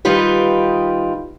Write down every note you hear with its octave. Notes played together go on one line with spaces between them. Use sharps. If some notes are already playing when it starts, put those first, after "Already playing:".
D#3 G3 D#4 F4 G4 B4